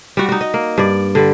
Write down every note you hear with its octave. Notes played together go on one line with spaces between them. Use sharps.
G3 F#4
D#4 F#4
D#5
A#3
G2 D5
D3 G3